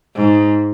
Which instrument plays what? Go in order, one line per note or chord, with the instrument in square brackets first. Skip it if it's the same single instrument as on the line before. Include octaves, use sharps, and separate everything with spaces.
[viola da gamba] G#2